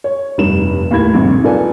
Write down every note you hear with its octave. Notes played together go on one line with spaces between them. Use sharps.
C#5
F1 G2 D#4 E7
D#2 A2 B5 G#6
A#1 G2 C3 D#3
D#4 F4 A4 B4 D5 G#5